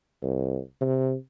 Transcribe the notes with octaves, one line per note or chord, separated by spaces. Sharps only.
C2
C3